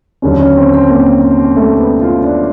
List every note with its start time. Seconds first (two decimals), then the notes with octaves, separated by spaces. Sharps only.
0.22 D#2 D3 F#3 C#4
0.39 C#4
0.57 C4
0.74 C4
0.90 A#3
1.56 A3
1.79 B3
2.02 F4
2.24 D4